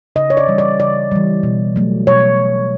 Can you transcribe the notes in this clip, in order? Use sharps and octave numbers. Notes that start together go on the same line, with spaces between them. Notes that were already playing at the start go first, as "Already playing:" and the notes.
C#3 D#5
C#5
D5
E3 G3
D5
C#3 D5
E3 G3
B2
F#3 A3
B2 C#5